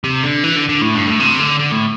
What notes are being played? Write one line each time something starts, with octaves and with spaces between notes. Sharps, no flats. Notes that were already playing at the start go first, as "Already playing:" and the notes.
C3
D3
E3
D3
D3
A2
G2
A2
C3
D3
D3
A2